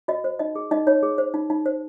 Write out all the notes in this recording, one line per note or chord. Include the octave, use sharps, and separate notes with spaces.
F#4 D#5
C5
D#4 D#5
G#4
D#4 D#5
D#4 C#5
G#4
C5
D#4
D#4
C5